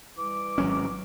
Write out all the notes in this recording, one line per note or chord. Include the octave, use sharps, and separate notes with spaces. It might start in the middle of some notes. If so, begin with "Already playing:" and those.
E3 G3 D6
G#1 F#3 C#4